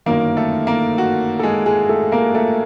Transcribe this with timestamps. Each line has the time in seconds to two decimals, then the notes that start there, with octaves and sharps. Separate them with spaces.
0.06 G1 F#2 D#3 A#3 A#4
0.37 A3 A4
0.67 A#3 A#4
0.98 F#4
1.39 A4
1.43 G#3 G#4
1.66 G#3 G#4
1.89 A3 A4
2.12 A#3 A#4
2.34 A3 A4